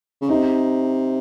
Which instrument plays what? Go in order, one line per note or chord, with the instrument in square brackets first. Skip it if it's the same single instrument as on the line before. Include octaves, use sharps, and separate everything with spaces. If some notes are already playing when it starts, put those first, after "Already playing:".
[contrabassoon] C#3
[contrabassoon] C3 [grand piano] D#4